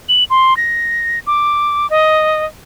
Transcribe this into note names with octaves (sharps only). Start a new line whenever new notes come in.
F#7
C6
A#6
D6
D#5